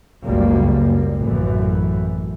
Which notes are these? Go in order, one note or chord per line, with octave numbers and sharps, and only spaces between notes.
F#1 C#2 F#2 G3 A#3
A1 F#2 E3